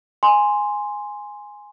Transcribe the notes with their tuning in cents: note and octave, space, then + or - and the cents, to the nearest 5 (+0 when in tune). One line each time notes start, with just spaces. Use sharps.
G#5 +0 C6 +0